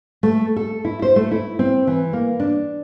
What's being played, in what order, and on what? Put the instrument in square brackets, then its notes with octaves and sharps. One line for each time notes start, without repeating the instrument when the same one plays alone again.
[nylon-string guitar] A3
A4
E4
C5
A3
E4
C4
E3
A#3
D4